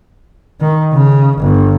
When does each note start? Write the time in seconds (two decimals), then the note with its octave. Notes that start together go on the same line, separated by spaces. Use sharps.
0.60 D#3
0.93 C#3
1.38 G1